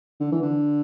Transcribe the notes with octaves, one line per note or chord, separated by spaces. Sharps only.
D3
E3
D3